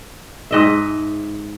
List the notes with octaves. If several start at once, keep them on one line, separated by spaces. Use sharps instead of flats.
G#2 D#5 E5